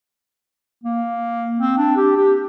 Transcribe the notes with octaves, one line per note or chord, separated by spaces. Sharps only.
A#3
C4
D4
G4
G4